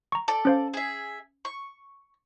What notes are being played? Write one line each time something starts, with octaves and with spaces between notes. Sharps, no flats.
A#5 C#6
A4 D5
C#4 C5 F5
G#4 E5
C#6